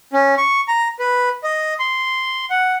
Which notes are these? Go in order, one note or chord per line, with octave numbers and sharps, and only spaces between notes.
C#4
C#6
A#5
B4
D#5
C6
F#5